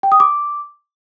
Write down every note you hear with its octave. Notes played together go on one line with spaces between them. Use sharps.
G5
D#6
D6